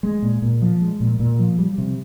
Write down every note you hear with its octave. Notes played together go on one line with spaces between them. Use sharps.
G#3
A#2
A#2
F3
G#3
A#2
A#2
F3
G3
C3